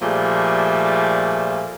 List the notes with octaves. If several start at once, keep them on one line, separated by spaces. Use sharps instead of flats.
A#2 F3 G3 A3 G#4